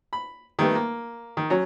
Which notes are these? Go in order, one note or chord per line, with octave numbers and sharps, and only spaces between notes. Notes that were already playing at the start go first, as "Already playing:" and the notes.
B5
D#3 G3 A3 B3
A#3
D#3
F#3 C#4